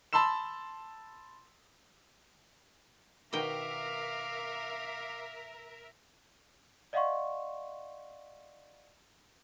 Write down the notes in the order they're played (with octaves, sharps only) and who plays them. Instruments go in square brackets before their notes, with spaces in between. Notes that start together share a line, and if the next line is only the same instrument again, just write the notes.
[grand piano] A5 B5 C6 E6 E7
[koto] B2 D#3 G5 [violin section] A#4 E5 [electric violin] F5 D6
[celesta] D5 D#5 F5 F#5 C6 C#6